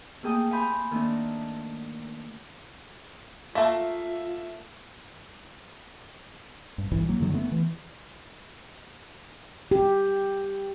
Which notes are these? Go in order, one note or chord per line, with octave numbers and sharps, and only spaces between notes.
A3 A#3 G#4 G5 D#6
F5 G#5 A5 B5 C6 G6
D#3 A3 A#3 D4
A3 A#3 F4 E5
G2
B1 G2 E3
F#3 A#3
F#2 D3 D#3 F#3
A3 B3
E3
G4